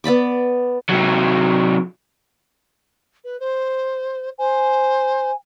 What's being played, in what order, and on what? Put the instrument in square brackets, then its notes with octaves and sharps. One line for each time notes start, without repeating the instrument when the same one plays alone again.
[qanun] B3 D5 B5 D6
[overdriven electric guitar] C3 F#3
[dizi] B4
C5
[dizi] C5 [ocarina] G#5